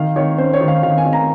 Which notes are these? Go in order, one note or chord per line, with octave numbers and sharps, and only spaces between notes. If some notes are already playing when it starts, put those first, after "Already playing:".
Already playing: D#3 F5
D#3 C#5
C#4 C5
C#5
D#3
F5
D#3 F5
G#5
D#3
A#5